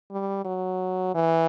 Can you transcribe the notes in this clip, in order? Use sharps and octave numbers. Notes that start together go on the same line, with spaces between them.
G3
F#3
E3